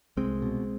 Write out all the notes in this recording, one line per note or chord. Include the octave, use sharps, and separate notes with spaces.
C2 G#3 C4
B2